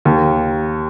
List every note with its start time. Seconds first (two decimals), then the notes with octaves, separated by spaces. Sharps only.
0.05 D#2